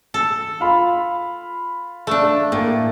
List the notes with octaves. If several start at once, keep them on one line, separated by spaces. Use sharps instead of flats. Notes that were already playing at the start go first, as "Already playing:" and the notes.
A4
F4 F5 B5
A3 D4
A2 A#3